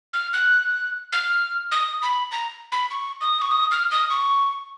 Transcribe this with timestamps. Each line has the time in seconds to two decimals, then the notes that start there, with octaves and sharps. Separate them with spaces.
0.13 F6
0.33 F#6
1.12 F6
1.72 D#6
2.02 B5
2.32 A#5
2.72 B5
2.91 C#6
3.21 D#6
3.42 C#6
3.51 D#6
3.71 F6
3.91 D#6
4.11 C#6